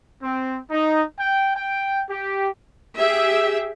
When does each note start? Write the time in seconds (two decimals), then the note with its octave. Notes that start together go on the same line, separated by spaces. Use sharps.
0.22 C4
0.70 D#4
1.18 G5
1.55 G5
2.09 G4
2.99 G4 G#4 E5